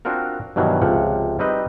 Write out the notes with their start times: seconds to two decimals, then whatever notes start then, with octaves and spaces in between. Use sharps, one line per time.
0.05 C4 D4 F4 F#4 A#4
0.56 G2 B2 D#3 E3 F#3
0.82 C#2 C3 F3 F#5
1.39 G3 C4 D#4 B4 D#5